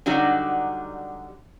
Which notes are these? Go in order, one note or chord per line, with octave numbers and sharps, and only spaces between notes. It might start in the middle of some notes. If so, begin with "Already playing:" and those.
D3 F#3 G3 D#4 F#4